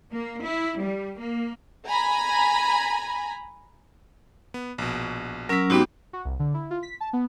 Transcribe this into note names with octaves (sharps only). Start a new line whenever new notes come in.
A#3
E4
G3
A#3
G#5 A#5 B5
B3
A#1 B2
F#3 C#4 A#4 E6 B6
G#2 B3 C4 D#4 F#4 G4
F#4
C2
D3
E4
F4
B6
A5
B3